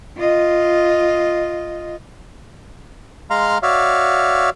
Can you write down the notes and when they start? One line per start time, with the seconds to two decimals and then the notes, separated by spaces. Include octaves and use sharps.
0.19 F4 D#5
3.30 G#3 F5 A#5 C6
3.63 F#4 C#5 D5 E5 F5